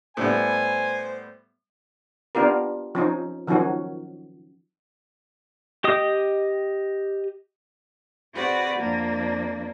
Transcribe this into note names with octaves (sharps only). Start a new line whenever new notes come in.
A2 G3 B3 C5 G#5
B3 D4 F4 G4 A#4
F3 C#4 D#4
D#3 F3 F#3 C#4 F#4
G4 D#5 D#6
C4 F#4 G#4 B4 D5 F#5
F2 A#3 D4